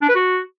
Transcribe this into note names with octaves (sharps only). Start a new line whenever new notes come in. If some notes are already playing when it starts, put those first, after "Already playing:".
D4
B4
F#4